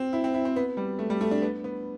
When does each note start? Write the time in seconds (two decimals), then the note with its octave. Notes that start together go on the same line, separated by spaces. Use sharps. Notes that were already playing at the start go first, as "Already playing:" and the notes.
Already playing: C4
0.13 E4
0.24 C4
0.34 E4
0.45 C4
0.56 B3
0.77 G3
0.99 A3
1.10 G3
1.21 A3
1.31 D4
1.42 B3
1.64 B3